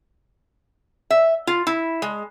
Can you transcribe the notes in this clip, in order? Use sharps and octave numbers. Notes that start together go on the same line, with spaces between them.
E5
F4
E4
G#3